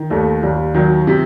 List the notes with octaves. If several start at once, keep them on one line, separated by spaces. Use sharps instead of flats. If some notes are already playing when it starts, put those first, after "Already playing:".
Already playing: D#3
D#2 A3
D#2 G3
D#3 F#3
C3